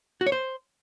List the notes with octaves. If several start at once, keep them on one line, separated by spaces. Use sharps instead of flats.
F#4
C#5
C5